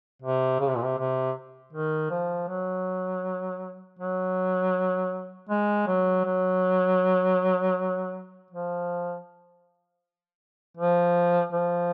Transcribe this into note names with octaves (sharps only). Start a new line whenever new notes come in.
C3
C#3
C3
A#2
C3
C3
D#3
F3
F#3
F#3
G#3
F#3
F#3
F3
F3
F3